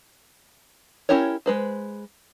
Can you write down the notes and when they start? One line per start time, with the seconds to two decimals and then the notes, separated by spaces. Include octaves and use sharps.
1.09 C#4 E4 G4 A#4 C#5
1.46 G#3 B4 C5